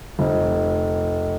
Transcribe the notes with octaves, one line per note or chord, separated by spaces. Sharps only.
F1